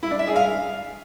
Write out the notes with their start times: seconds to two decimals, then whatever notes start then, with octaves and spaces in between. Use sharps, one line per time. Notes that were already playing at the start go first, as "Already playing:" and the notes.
0.03 E4
0.11 D4
0.19 E5
0.27 G#4
0.36 F5